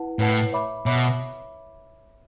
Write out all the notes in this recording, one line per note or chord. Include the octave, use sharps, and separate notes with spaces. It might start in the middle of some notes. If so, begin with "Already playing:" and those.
Already playing: E4 B4 F#5 A5
A2 E4 B4 F#5 A5
C#5 E5 B5 D6
B2 C#5 E5 B5 D6